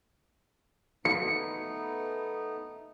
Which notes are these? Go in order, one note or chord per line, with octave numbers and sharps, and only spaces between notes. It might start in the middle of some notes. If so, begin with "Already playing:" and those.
A3 B3 D#4 C#7